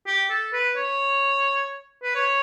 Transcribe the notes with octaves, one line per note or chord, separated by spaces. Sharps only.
G4
A4
B4
C#5
B4
C#5